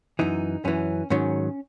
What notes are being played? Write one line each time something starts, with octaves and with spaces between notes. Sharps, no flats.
F#2 E3 D#4
F#2 E3 C#4
G#2 D#3 F#3 C#4